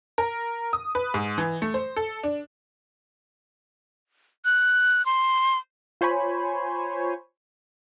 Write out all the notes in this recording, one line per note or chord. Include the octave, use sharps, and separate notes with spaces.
A#4
D#6
B4
G#2
E3
A3
C5
A4
D4
F#6
C6
F4 C5 C#5 G#5 B5